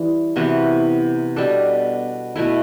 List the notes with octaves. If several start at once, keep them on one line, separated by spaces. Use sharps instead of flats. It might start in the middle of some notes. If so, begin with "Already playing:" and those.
Already playing: E3 G3
C3 E3 B3 F#4
B2 G3 D4 A4
B2 A3 E4